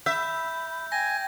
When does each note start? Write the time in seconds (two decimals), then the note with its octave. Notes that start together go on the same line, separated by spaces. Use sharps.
0.06 E5 B5 G6
0.92 G5 G#5 A#6